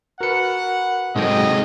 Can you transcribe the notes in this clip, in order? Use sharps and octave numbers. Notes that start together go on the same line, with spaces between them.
F#4 A#4 B4 F#5 C#7
G#2 C3 F#3 G#3 G#4 A4 D#5 G5